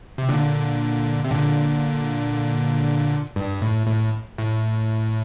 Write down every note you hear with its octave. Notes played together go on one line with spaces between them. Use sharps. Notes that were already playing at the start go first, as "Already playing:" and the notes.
C3
A#2 D3
C3
A#2 D3
G2
A2
A2
A2